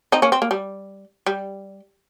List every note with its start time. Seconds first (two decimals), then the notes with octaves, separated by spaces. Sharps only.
0.12 C4 D#4
0.22 A#3 C#4
0.32 C4
0.42 A#3
0.51 G3
1.26 G3